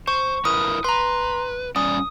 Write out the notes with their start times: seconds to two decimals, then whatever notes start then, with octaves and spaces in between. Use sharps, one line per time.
0.08 C5 C#6
0.45 E4 A#4 B4 D#6
0.84 B4 A#5 C6
1.76 G3 C#4 D5 D#6